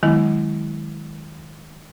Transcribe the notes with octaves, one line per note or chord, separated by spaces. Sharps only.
D#3 F#3 G#3 B3 E4